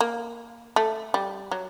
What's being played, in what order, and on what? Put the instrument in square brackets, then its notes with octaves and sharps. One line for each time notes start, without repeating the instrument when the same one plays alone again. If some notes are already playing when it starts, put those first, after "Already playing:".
[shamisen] A#3
A3
G3
F#3